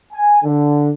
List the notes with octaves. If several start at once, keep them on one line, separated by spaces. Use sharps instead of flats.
G#5
D3